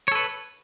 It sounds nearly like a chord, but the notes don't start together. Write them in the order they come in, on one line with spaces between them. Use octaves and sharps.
C#5 A4 B4